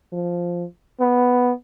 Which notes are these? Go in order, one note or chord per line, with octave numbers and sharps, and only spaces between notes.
F3
B3